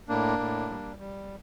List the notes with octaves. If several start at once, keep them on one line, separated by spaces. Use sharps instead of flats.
A2 A#3 D4
A2
G3
G3